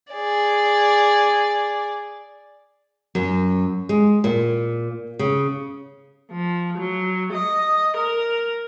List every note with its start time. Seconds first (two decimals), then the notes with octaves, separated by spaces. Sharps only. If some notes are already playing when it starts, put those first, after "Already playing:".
0.13 G#4 D5
3.15 F#2
3.89 G#3
4.24 A#2
5.19 C#3
6.31 F3
6.78 F#3
7.33 D#5
7.96 A#4